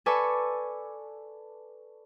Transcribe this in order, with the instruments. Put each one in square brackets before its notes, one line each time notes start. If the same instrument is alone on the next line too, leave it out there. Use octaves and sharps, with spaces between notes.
[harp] A4 B4 D5 G#5 C#6 E6